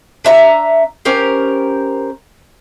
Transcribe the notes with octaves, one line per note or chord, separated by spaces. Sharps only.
D4 E5 A#5
C#4 G4 A#4 C5